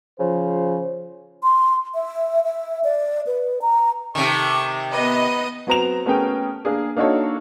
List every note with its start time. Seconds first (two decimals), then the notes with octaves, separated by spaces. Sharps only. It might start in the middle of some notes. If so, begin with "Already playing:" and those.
0.19 C#3 F3 C5
1.43 C6
1.94 E5
2.44 E5
2.84 D5
3.27 B4
3.62 A#5
4.15 C3 D#3 A4 C#6
4.93 B3 D#4 B4 D#5
5.67 F#3 B3 C4 A#5 E7 F7
6.06 A3 B3 C#4 G#4 A#4 G5
6.65 A#3 D4 G#4
6.97 A#3 D4 D#4 F#4 A4 C#5